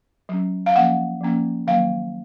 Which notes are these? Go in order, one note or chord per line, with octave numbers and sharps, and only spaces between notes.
F#3 C#4
F5
F3 A#3 C#4 F#5
F3 A#3 C#4
D#3 F#3 A#3 F5